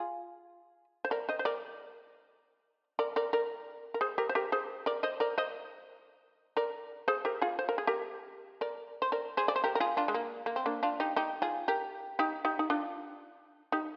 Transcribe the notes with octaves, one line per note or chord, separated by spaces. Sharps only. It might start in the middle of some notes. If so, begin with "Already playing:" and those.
Already playing: F4 G#4
C5
A#4 D5
C5 D#5
C5
A#4 D5
A#4 D5
A#4 D5
A#4 D5
A#4
G#4 C5
G4 A#4
C5
G4 A#4
G#4 C5
A#4 D5
C5 D#5
A#4 D5
C5 D#5
A#4 D5
G#4 C5
G4 A#4
F4 G#4
C5
A#4
G#4
G4 A#4
A#4 D5
C5
A#4 D5
G#4 C5
D5
C5
G4 A#4
A#4
F4 G#4
D4 F4
G#3
A#3
A#3
C4
A#3 D4
D4 F4
D#4 G4
D#4 G4
F4 G#4
G4 A#4
D#4 G4
D#4 G4
D#4
D4 F4
D#4 G4